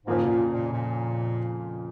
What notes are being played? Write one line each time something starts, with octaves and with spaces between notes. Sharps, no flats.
F2 G#2 C#3 F3 A#3 F4
B2
A#2
A#2
A#2